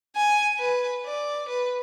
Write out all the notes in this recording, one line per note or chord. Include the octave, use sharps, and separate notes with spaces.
G#5
B4
D5
B4